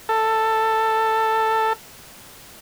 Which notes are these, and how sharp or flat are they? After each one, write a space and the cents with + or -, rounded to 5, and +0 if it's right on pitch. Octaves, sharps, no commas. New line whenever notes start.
A4 +10